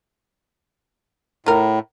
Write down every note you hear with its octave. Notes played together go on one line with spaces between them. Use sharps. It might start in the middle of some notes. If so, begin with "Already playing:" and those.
A2 F4 A#4